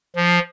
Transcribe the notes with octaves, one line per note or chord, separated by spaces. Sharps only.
F3